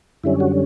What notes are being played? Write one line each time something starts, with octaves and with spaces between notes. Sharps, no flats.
F#2 D3 G3 C#4 E4
F#4